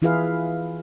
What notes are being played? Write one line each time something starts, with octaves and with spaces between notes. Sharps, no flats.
E3 E4 F4 G#4 B4 F5